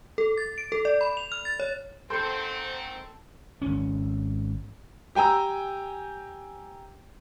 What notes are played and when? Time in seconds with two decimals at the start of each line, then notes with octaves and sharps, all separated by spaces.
0.18 A4
0.38 A6
0.58 D7
0.72 A4
0.85 D5
1.01 B5
1.17 F7
1.32 F6
1.45 A6
1.60 C#5
2.10 G#2 D#3 C4 A4 C5 C#7
3.62 G#1 C#4
5.15 G4 G5 G#5 A#5 E6